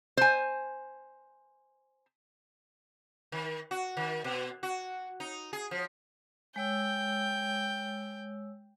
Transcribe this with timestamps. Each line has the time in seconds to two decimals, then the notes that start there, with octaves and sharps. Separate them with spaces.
0.17 C5 G#5
3.32 D#3
3.71 F#4
3.97 D#3
4.24 B2
4.63 F#4
5.20 D#4
5.53 G#4
5.71 F3
6.56 G#3 C#5 G5 E6